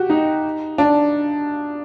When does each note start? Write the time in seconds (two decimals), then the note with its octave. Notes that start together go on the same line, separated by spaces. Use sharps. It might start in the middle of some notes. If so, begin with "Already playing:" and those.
Already playing: F#4 G4
0.10 D#4
0.78 D4